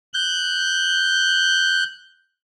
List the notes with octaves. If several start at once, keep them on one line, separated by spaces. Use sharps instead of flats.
F#6 G6